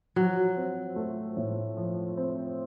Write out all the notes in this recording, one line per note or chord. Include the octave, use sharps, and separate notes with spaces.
F3 F#3
C4
A3
A2
F3
C4